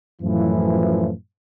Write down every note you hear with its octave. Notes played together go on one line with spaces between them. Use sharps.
F#2 A2 E3 F3